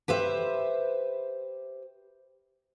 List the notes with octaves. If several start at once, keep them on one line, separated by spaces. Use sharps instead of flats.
G4 B4 C5 E5